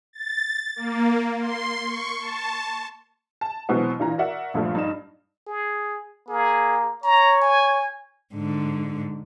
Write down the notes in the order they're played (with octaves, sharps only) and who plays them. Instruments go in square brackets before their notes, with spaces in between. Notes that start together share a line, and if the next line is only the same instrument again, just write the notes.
[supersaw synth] A6
A#3
C6
C#6
A5
[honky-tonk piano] A5
B2 E3 F#3 G#3 B3 C4
A#2 E3 A#5
F#4 A#4 D5 E5 F#5
A#1 G2 A#2 F3 A3
G2 D#4 E7
[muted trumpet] G#4
[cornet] A#3 [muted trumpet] G#4
[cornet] C#5 [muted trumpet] A#5
[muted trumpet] G#5
[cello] G#2 D3